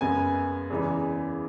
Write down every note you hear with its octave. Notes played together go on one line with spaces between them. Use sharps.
F#2 C#3 G#3 B3 G#5
E2 C#3 E3 G#3